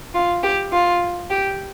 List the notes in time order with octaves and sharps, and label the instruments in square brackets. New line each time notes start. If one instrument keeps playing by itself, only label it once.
[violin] F4
G4
F4
G4